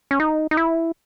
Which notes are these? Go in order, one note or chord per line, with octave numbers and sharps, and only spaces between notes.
C#4
D#4
D#4
E4